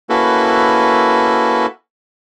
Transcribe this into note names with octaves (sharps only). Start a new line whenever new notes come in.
A#3 C#4 E4 F#4 A4 B4